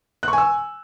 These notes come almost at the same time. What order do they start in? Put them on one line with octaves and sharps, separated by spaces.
F#6 C#6 G#5 E6